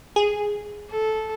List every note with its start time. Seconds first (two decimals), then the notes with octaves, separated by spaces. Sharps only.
0.16 G#4
0.90 A4